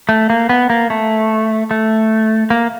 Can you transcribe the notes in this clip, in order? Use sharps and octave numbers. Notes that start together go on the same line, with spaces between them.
A3
A#3
B3
A#3
A3
A3
A#3